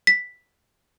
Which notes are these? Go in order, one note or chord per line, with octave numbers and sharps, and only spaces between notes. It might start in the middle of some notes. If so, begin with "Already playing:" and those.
B6